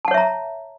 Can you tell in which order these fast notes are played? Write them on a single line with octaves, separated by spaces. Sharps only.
A5 F#5 C#5 E5 A#5